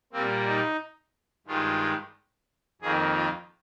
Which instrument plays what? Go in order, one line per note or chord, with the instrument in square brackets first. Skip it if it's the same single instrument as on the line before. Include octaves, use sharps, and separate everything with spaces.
[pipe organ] A#2 G3 A#3 C4
D#4
G2 D#3 G#3 F4
F2 D#3 A#3 G#4
F4